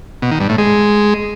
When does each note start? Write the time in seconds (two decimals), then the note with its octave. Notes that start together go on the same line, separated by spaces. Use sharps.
0.22 B2
0.31 D#3
0.40 G2
0.49 A2
0.58 G#3